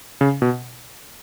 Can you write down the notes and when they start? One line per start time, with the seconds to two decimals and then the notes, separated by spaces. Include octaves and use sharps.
0.21 C#3
0.42 B2